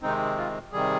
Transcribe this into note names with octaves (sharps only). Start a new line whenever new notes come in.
C3 D#3 G#3 C4 D#4
F4
C3 D#3 G3 G#4